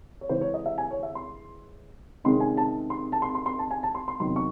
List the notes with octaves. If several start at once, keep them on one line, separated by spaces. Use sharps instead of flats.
C#5
C#3 E3 G#3 C5
C#5
D#5
E5
G#5
C#5
E5
C6
C3 D#3 G#3 C#4 C6
G#5
A5
C6
A5
C6
C6
C6
A5
G#5
A5
C6
C6
E2 C3 D#3 F#3 C6
C#6